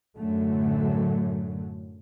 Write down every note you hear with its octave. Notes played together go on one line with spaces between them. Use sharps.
F#2 A2 D3 F#3 A3